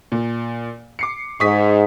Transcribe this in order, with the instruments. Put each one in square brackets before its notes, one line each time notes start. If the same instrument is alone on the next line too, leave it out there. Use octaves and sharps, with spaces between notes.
[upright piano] A#2
D6 C7 C#7
[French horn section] G#2 [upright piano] C#6 D#6 B6